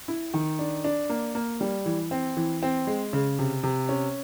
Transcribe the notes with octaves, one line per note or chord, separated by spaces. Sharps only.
E4
D#3
D4
D4
A#3
A#3
G3
E3
C4
E3
C4
G#3
C#3
C3
C3
C#4